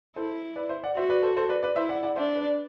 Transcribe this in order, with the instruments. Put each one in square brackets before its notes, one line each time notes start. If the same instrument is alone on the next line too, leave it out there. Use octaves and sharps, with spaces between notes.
[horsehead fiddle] E4 [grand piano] A4 C5
[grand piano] B4 D5
C5 E5
D5 F#5
[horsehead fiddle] F#4 [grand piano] C5 E5
[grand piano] B4 D5
A4 C5
A4 C5
B4 D5
B4 D5
[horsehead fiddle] E4 [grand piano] C5 E5
[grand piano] D5 F#5
D5 F#5
[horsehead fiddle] D4 [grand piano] C5 E5
[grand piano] B4 D5